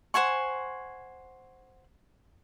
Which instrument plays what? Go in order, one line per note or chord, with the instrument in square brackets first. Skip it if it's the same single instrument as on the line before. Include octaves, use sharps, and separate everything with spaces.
[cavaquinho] C5 F#5 G#5 C#6